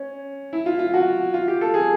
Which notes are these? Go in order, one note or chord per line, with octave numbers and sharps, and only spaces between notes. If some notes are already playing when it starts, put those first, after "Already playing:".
Already playing: C#4
E4
F4
F4
F#4
F4
G4
A4
G#4